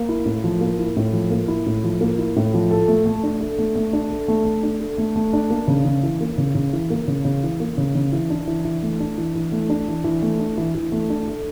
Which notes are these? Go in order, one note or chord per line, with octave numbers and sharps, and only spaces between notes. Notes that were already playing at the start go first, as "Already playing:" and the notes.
Already playing: A#3
E4
A2
F3
A#3
E4
A2
F3
A#3
E4
A2
F3
A#3
E4
A2
F3
A4
A3
A3
D4
A4
A3
A3
D4
A4
A3
A3
D4
A4
A3
A3
D4
A#3
C#3
C#3
E3
A#3
C#3
C#3
E3
A#3
C#3
C#3
E3
A#3
C#3
C#3
E3
D4
E3
E3
A3
D4
E3
E3
A3
D4
E3
E3
A3
D4
E3
E3
A3
D4
A4